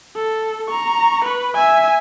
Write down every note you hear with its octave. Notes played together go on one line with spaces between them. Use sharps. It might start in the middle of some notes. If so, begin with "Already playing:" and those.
A4
A#5 C#6
B4
E5 G#5